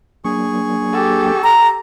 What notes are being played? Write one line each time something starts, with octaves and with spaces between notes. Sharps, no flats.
F#3 A#3 D4 G#4 C#6
G4 A4
A#5